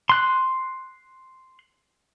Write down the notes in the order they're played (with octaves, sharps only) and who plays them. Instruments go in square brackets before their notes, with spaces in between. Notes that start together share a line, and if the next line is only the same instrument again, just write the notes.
[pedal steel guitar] C6 F#6